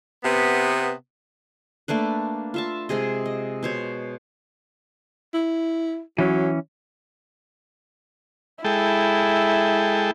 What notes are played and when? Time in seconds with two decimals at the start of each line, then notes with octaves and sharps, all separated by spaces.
0.24 C3 B3
1.88 A3 A#3 D4 B4
2.54 F4 E5 A5
2.89 C3 G#3 G#4 D#5
3.26 D#5
3.63 B2 C5 C#5
5.34 E4
6.18 E3 F#3 C#4
8.64 G#3 E4 A4 G5